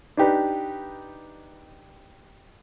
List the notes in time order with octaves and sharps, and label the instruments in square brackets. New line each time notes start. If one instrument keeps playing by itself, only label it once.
[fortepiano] D4 D#4 G4 B4